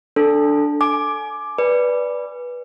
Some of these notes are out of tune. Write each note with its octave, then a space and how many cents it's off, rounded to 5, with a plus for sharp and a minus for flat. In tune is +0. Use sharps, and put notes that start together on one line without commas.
D4 +0 A4 +0
G#5 +30 D6 +10
B4 -10 D5 -5 G#5 -20